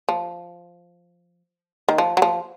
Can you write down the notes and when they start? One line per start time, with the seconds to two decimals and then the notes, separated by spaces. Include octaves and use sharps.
0.09 F3
1.89 D#3
1.98 F3
2.17 F#3
2.22 F3